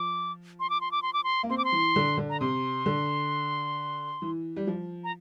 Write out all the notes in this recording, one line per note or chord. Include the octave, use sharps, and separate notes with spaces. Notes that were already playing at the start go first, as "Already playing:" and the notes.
Already playing: F3 D6
C6
D6
C6
D6
C6
D6
C6
A#3
C4 C6
D6
C6
E3
D3
D3
A#5
C3 C6
D3
E3
G3
F3
A#5